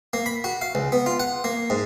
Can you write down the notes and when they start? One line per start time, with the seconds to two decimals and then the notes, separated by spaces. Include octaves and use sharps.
0.13 A#3
0.26 B5
0.44 F#4
0.61 F5
0.75 C#2
0.92 B3
1.06 F4
1.20 F#5
1.44 A#3
1.70 G#2